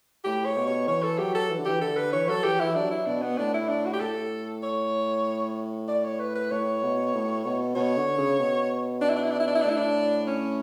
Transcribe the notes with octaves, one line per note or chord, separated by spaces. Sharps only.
A2 G4
C#5
B2
C#5
E3 C#5
A4
F#3 G4
A4
E3
D3
E3 G4
D3 A4
B4
E3 C#5
F#3 A4
E3 G4
E3 E4
F#3 D4
E4
B2 D4
B3
A2 D4
E4
D4
F#4
G4
A2 A4
C#5
D5
C#5
B4
B4
A2 C#5
B2
A2
B2
B2 C#5
D3
C#3
B2
D4
E4
D4
E4
D4
E4
D4
E4
A2 D4
E4
D4
C#4